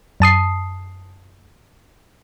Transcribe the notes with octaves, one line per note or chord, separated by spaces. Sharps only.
F#2 A5 D#6 C7